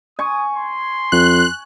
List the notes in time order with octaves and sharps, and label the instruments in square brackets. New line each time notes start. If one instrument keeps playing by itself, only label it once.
[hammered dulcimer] G#5 C#6 [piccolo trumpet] D#6
[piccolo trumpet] C6
[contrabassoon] F2 [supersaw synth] F#6